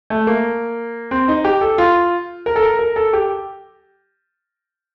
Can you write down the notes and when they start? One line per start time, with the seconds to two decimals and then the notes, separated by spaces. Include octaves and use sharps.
0.10 A3
0.27 A#3
1.11 C4
1.28 D#4
1.45 G4
1.61 A4
1.78 F4
2.46 A#4
2.56 A4
2.63 A#4
2.79 A#4
2.96 A4
3.13 G4